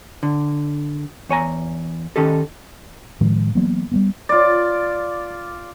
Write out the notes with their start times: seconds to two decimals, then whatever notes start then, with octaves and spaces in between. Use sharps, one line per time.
0.23 D3
1.29 E2 C#5 G#5 A#5
2.16 D#3 C#4 D#4 G4 A4
3.21 A2 D#3 F3 G#3
3.55 E3 F#3 A#3 B3
3.92 G3 A3 B3
4.29 F4 D5